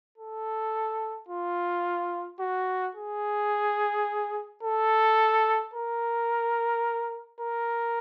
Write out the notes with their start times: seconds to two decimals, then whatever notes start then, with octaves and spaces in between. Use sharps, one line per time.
0.18 A4
1.28 F4
2.40 F#4
2.95 G#4
4.63 A4
5.74 A#4
7.41 A#4